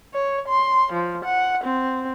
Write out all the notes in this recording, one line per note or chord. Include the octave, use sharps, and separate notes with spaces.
C#5
C6
F3
F#5
C4